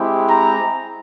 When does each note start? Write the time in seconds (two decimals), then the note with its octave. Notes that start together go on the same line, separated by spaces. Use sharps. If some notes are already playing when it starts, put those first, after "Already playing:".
Already playing: G#3 C4 E4 G4
0.28 A#5